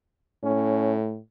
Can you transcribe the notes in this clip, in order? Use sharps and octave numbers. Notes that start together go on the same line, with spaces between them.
A2 C#4